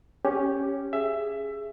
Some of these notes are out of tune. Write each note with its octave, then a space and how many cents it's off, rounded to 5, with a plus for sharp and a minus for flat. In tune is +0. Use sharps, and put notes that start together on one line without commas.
C#4 +0 G4 +0
G#4 +0 E5 +20